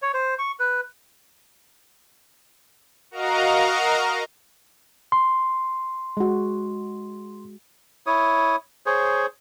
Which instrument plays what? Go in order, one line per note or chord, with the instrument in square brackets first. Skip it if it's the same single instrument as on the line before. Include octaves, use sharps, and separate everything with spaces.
[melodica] C#5
C5
C#6
B4
[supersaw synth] F#4 A#4 D#5 F5 A#5
[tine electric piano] C6
[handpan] G#3 F#4
[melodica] E4 C#5 D#6
G#4 C5 C#5